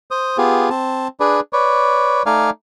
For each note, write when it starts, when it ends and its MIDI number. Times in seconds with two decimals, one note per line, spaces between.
0.11 0.37 72
0.11 0.37 87
0.38 0.69 59
0.38 0.69 65
0.38 0.69 67
0.38 0.69 68
0.70 1.08 60
0.70 1.08 81
1.20 1.40 62
1.20 1.40 68
1.20 1.40 71
1.20 1.40 74
1.53 2.22 71
1.53 2.22 73
1.53 2.22 74
2.26 2.50 57
2.26 2.50 63
2.26 2.50 74
2.26 2.50 77
2.26 2.50 80